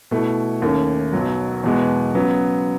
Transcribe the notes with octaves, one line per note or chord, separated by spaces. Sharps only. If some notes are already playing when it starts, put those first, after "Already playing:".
B2 A3 E4
D#2 D#3 A3 C#4
B1 B2 F#3
E2 B2 G#3 B3
C#3 F#3 B3